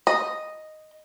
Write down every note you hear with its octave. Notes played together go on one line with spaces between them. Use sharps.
D#5